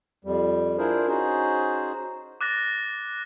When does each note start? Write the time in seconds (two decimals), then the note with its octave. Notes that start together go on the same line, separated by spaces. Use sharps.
0.25 F2 G3
0.78 D4 E4 F4 G#4 A#4 C5
1.08 C#4 D#4 F#4 G#4 C5
2.41 D6 F#6 A6 A#6